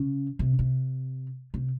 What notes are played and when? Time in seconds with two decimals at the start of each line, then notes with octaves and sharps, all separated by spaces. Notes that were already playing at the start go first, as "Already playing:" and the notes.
Already playing: C#3
0.39 C3
0.59 C3
1.54 C3